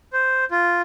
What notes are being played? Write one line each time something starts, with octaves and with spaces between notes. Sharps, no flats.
C5
F4